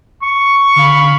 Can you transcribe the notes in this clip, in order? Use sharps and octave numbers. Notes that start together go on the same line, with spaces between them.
C#6
D3 F5 B5